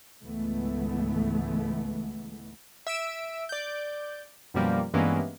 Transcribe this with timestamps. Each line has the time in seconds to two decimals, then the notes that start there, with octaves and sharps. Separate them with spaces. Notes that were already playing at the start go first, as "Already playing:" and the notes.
0.24 G#1 C#2 E3 G#3 A3 B3
2.87 E5 E6 D7
3.49 D5 G6
4.54 F#2 B2 F3 G3 A#3
4.94 G2 E3 G#3 A#3 B3 C#4